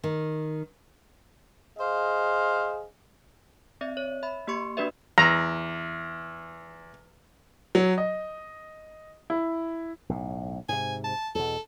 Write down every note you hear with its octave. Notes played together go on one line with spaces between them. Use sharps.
D#3
G#4 C5 D#5 F5
C4 D5 E5
C#5
E5 B5
A#3 G4 C6 C#6 C#7
A#3 D4 F#4 B4 D5 E5
E2 A#5
F#3
D#5
E4
B1 A2
G#2 C3 G#5
A5
E2 B2 A4